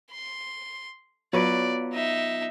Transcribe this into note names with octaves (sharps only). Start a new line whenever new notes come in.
C6
F#3 B3 F4 B4 D5
D#4 E5